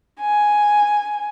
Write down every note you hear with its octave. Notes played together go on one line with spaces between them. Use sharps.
G#5